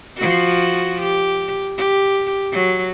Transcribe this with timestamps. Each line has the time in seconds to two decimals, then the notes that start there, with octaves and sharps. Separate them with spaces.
0.17 F3 F#4
1.02 G4
1.78 G4
2.52 F#3